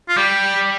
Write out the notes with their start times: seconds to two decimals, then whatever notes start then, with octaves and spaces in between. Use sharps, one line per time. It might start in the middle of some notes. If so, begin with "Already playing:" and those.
0.09 F4
0.17 G3 G4